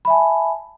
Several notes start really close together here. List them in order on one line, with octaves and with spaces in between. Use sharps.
B5 E5 G#5 A5